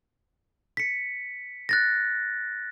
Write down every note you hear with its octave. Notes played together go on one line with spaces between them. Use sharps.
B6 C#7
F#6 A6 A#6